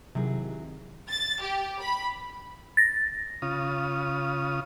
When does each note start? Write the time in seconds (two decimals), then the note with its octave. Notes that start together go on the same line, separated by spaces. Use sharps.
0.15 C3 D#3 F#3 E4 G#4
1.09 A6
1.41 G4
1.81 B5
2.77 A6 A#6
3.42 C#3 F4 D#6